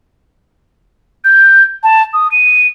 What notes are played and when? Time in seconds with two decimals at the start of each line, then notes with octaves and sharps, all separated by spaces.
1.24 G6
1.83 A5
2.13 D#6
2.31 D#7